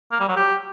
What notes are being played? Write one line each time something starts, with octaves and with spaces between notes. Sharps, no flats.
A#3
G3
F#3
G4